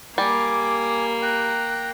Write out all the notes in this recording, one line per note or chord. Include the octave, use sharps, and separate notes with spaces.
G3 A#3 G#5 D6
G5 A#5 F#6